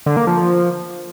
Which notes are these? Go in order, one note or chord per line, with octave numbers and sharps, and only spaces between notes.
D3
A#3
F3